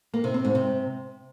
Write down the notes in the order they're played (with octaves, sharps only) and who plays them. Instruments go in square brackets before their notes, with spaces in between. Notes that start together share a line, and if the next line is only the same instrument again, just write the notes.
[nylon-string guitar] A#3
C3
C4
G#2
C3